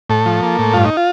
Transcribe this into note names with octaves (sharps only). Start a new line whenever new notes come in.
A2 A4
F3
A#3
A2
G2 F4
D#4
F4